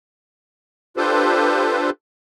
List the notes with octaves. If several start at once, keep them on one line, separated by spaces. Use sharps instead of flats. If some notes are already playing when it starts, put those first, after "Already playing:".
D4 F4 G4 A4 B4 C5